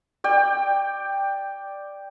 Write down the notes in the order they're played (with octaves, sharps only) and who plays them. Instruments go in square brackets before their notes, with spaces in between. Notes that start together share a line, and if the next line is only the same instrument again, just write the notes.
[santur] D5 G5